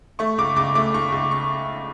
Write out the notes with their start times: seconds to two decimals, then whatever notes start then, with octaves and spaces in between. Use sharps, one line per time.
0.19 A3 C#6
0.38 C#2 D6
0.56 C#2 D6
0.75 A3 D6
0.94 C#2 C#6
1.12 C#2
1.31 C#6